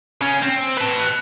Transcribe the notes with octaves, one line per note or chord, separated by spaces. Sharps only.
C#3 C#4
C4
B4 A5